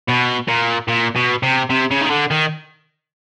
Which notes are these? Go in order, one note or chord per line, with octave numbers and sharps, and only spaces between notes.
B2
A#2
A#2
B2
C3
C3
C#3
D#3
D3
D#3